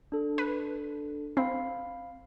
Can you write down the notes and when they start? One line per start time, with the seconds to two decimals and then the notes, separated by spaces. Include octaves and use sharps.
0.12 D4 A4
0.38 B4
1.37 C4 F5 B5 C7